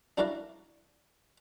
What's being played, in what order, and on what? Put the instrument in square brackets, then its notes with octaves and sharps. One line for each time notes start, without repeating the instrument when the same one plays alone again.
[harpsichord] D4 E4 F#4 A#4 D5 F5